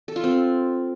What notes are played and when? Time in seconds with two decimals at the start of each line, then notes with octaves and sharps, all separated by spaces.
0.08 A4
0.16 F4
0.24 C4